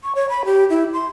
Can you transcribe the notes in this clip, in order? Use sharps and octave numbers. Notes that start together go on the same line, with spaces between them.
C#6
C#5
B5
G4
E4
C6